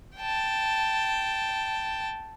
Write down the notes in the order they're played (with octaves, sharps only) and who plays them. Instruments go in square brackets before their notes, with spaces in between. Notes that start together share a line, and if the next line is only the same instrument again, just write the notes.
[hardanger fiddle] G5 A5